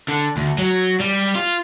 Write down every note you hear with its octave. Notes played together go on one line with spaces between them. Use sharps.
D3
D2
F#3
G3
F4